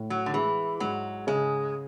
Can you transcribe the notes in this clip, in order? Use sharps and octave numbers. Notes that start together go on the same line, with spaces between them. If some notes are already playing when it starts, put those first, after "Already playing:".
Already playing: A2
F#3
D3
E3 G#3
G#2 F#3
C#3 G#3